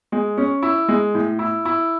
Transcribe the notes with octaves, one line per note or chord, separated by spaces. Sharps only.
G#3
C#4
E4
G#3
A2
E4
E4